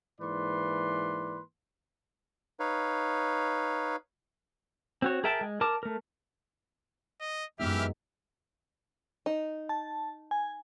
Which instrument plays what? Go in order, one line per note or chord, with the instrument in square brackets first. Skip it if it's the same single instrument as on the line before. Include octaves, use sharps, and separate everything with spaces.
[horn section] G#2 E3 A#3 B4 D5 C6
[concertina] D#4 B4 C#5 F5
[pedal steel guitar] C4 F#4 C#5
G#4 A#4 E5 G5 A5
G#3
A#4 A5 D6
A3 A#4
[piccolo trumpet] D#5
[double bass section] F#2 [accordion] E3 E5 F6 [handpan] G#3 B3 D#4 [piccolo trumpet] G4
[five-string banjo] D#4
[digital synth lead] A5
G#5